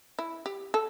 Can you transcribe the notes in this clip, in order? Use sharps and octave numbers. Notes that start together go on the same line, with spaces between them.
E4
G4
A4